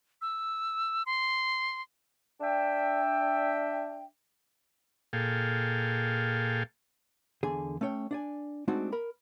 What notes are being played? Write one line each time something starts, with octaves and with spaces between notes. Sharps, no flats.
E6
C6
D4 E5 G5
A#2 G#4 A4 F5 G5
E2 D3 G#4 G#5
A3 C#4 C#5 G5
D4 D5 G#5
G#3 A3 C4 D4 D#4 F#4
A#4 B5